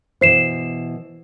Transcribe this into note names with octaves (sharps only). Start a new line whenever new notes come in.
B2 E3 E4 C5 C7 E7